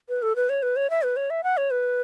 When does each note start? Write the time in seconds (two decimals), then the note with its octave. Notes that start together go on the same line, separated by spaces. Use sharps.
0.09 B4
0.22 A4
0.36 B4
0.49 C#5
0.63 B4
0.76 C#5
0.90 E5
1.03 B4
1.16 C#5
1.30 E5
1.44 F#5
1.57 C#5
1.71 B4